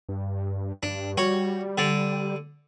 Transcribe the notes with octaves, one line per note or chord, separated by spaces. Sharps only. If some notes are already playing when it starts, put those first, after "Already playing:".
G2
G2 D4
G3 F#4 C#5
D3 D5